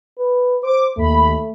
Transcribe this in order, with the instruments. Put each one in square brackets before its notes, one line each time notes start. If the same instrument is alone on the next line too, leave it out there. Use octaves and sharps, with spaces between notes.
[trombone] B4
[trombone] C5 [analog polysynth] D6
[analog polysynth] D#2 B5 [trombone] A3